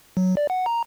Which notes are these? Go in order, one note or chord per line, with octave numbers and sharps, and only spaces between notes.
F#3
D5
F#5
A#5